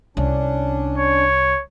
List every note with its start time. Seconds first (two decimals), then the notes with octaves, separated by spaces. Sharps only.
0.17 C2 C#4 D4
0.98 C#5